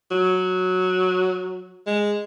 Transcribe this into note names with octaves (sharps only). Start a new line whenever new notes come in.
F#3
G#3